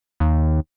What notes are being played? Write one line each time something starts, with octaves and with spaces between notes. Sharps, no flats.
D#2